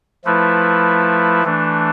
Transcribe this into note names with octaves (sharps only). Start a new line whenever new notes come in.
F3 A3 E4 B4
E3 A3 D4